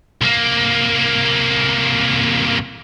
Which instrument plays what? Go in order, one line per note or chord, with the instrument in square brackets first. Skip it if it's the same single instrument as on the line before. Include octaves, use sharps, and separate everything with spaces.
[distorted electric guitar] C2 A#3